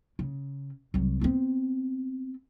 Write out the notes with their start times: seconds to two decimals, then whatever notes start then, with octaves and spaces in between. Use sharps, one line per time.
0.19 C#3
0.94 C2 F#3
1.21 B3 C4